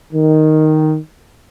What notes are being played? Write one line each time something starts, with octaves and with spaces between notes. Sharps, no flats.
D#3